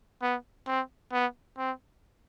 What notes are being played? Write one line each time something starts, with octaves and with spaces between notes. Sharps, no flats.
B3
C4
B3
C4